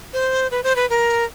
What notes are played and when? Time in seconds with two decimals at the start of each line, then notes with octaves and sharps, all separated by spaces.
0.13 C5
0.51 B4
0.64 C5
0.76 B4
0.90 A#4